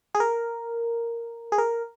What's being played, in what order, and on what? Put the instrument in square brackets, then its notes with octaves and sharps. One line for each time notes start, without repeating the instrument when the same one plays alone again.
[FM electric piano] G#4
A#4
G#4
A#4